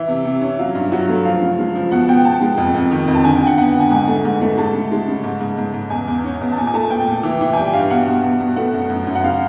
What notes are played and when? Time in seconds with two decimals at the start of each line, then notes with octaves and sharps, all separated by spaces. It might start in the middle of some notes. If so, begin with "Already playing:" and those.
Already playing: E3 E5
0.08 C3
0.25 C3
0.41 C#4
0.59 F#3 F5
0.75 G2
0.92 F#3
1.09 A3
1.25 F3 F5
1.42 C#3
1.59 G#3
1.75 F3
1.91 B2 F#5
2.08 B3 G5
2.25 B2 A5
2.41 G#3
2.58 F2
2.74 F2
2.91 D#3
3.08 F2
3.15 A5
3.24 D3 G#5
3.36 G5
3.41 D3
3.47 F#5
3.58 B3 F#5
3.74 D3
3.80 G#5
3.91 G#2 G#5
4.08 A3
4.25 G#2
4.42 A3
4.57 G#3 A5
4.74 C#3
4.92 G#3
5.08 C#3
5.24 G#2
5.41 G#2
5.58 G#2
5.74 G#2
5.90 E2 G#5
6.08 E2
6.24 C#4
6.41 E2
6.52 A5
6.57 A#2 G#5
6.67 G#5
6.74 A3 A5
6.90 A#2 G5
7.07 A#2
7.23 E3
7.41 E3
7.53 G#5
7.57 G3 G5
7.73 G2 F5
7.90 B2 F#5
8.06 B2
8.24 B2
8.40 B2
8.56 A3 F#5
8.74 F#2
8.90 F#2
9.07 F#2
9.15 F#5
9.24 C#3 F5